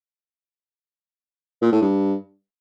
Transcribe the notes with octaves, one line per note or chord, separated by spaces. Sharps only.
A#2
A2
G2